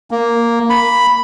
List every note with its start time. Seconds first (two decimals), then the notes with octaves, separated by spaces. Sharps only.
0.11 A#3
0.70 B5